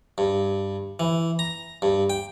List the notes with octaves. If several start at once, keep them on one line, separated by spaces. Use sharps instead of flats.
G2
E3
A#5
G2
G5